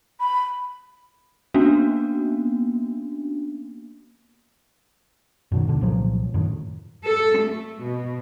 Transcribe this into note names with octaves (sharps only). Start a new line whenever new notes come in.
B5
A#3 B3 C#4 D4 F#4
F#2 B2 D#3
E1 D2 B2 D3
C2 A#2 F3 F#3
F#2 A2 D#3
A4
A3
B2